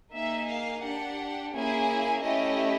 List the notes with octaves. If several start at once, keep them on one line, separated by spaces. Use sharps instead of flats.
A#3 D#4 G#4 E5
F5
D4 G4 F#5
A#3 C#4 E4 G#4 G#5
A3 C#4 E4 G4 D#5